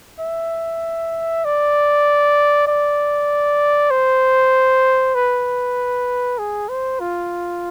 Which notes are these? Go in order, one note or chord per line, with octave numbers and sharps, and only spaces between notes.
E5
D5
D5
C5
B4
G#4
C5
F4